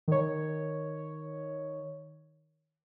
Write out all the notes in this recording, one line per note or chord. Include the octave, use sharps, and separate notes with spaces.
D#3 C#5